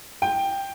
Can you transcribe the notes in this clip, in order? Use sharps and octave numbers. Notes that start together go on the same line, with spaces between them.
G5